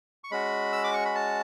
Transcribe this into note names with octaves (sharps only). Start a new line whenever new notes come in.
C#6
G#3 C#4 F#4 B5
E6
D6
C#6
B5
A5